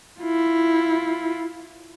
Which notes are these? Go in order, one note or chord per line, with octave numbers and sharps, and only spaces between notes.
E4 F4